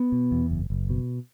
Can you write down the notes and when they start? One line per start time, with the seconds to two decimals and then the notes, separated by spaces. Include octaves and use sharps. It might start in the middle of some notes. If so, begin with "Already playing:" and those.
Already playing: B3
0.12 B2
0.31 E2
0.51 F#1
0.70 F#1
0.90 B2